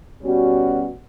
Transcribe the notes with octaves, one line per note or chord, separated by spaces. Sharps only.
B2 G3 C#4 F#4